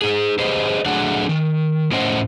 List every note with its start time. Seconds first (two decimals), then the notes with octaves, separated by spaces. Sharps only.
0.02 D#4 G#4
0.38 G4 G#4 B4 C5 D#5
0.86 F#3 A3 D4 G#4 F#5
1.29 D#3
1.91 A2 A3 C#4 C5 D#5 F#5